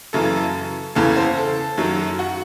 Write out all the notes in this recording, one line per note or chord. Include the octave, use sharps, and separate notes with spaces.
F#2 C#3 E3 A4
E2 C#3 E3 A4
C5
A4
F#2 D#3 F#3
F#4